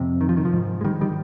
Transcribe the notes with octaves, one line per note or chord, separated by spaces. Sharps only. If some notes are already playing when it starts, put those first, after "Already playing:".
Already playing: F2 C3
D#3
F3
D#3
F3
G#2
G#3
D#3 G3
D#3 G3